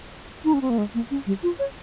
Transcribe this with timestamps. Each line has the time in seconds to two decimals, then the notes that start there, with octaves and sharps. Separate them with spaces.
0.44 D#4
0.54 C#4
0.61 C4
0.70 A#3
0.78 G#3
0.94 A#3
1.11 C#4
1.26 G3
1.43 F4
1.59 C#5